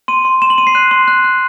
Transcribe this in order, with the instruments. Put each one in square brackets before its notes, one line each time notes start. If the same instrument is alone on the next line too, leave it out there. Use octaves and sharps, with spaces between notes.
[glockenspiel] C6 D#7
C6
C6 E7
F#7
C6 D#7
C7
F#6 D#7
C6
F#6
F#6